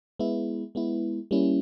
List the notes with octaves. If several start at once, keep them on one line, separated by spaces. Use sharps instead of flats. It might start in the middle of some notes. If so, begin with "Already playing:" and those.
G#3 B3 E4
G#3 B3 E4
G3 A#3 C#4 E4